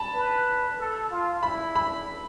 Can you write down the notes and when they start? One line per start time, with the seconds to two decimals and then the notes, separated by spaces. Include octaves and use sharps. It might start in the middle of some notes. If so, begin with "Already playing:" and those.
Already playing: A5 B5
0.15 B4
0.79 A4
1.11 F4
1.43 E4 B5
1.76 B5